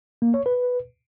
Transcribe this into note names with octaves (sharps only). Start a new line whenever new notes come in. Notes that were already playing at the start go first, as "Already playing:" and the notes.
A#3
C#5
B4